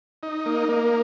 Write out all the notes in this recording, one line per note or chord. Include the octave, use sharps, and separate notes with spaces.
D#4
A#3
A#3